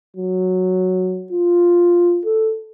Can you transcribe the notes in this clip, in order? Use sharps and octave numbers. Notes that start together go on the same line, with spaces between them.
F#3
F4
A4